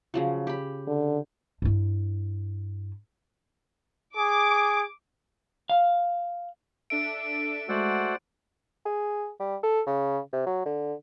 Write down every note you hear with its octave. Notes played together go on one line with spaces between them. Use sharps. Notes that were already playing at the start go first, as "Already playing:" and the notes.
C#3 F3 F#3
G4 B5
D3
G2 E4
G#4 D6
F5
D4 A4 E5 D7
G#3 A3 F#4 C5 D5 F#5 E6
G#4
G3
A4
C#3
C3
F#3
D3